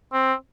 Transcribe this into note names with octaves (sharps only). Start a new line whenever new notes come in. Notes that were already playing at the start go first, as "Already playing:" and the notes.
C4